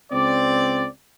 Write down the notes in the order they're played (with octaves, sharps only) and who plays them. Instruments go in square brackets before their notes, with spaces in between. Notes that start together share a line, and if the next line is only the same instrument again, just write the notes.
[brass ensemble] C#2 C4 D5